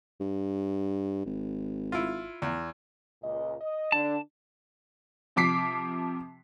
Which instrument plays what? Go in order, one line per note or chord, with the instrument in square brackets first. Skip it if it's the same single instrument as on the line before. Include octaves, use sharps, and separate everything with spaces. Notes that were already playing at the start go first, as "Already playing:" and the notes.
[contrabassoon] G2
G#1
[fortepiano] E4 F4
E2
[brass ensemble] C#2 A#2 D#5
D#5
[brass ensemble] D3 D4 [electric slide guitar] A5
[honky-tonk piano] C3 F3 D6 B6 C7